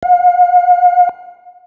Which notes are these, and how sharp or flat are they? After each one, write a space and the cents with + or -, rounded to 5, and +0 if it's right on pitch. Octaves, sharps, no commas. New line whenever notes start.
F5 +45